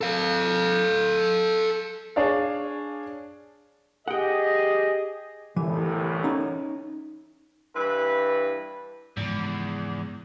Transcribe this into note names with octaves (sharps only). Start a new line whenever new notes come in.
A4 F5
D4 G#4 C#5 D5 F5
G4 G#4 D#5 F#5 G5
G1 C2 A2 E3
C#4 D#4
G2 E3 B4
E2 G#2 C#3 F3